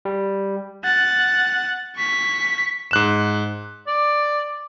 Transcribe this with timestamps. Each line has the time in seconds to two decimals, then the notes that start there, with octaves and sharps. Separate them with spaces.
0.05 G3
0.84 F#5 A6
1.97 C#6 B6
2.91 G#2 F#6 E7
3.87 D5